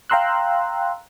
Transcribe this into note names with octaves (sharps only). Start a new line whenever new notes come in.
F5 G5 A#5 C6 E6 F#6